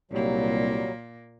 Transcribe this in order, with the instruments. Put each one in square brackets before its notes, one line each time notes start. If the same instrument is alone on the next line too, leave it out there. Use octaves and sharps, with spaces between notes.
[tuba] C2 [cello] A#2 A#3 [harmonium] F#3 G3